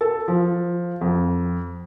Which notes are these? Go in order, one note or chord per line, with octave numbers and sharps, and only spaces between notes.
A4
F3
F2